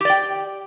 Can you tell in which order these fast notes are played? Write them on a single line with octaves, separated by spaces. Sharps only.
G4 D5 G5